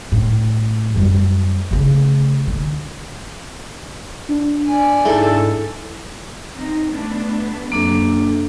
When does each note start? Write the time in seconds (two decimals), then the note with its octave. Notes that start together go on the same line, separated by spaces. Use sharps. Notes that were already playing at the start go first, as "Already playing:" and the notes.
0.12 A2
0.96 F#2 G3
1.71 C#3 A3
2.47 D3
4.29 D4
4.66 D5 G#5
5.05 G#2 G#3 E4 A4
6.56 C4 D#4
6.93 A3 B3 D4
7.72 F#2 C3 A#3 D4 A4